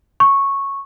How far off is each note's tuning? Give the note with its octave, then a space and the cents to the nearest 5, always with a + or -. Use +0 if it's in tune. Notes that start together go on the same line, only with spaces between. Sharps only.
C#6 -10